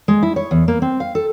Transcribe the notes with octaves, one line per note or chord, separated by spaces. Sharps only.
G#3
E4
C#5
E2
A#3
C4
F5
A4